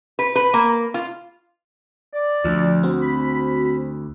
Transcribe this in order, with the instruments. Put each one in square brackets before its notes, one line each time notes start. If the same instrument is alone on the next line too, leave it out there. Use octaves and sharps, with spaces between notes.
[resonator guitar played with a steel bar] B4
B4
A#3
F4
[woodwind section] D5
[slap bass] D2 [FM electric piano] F3
[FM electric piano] C4 F#4 C5
[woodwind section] B5